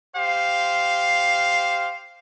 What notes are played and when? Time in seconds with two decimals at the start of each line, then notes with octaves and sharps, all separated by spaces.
0.17 G4 C5 F5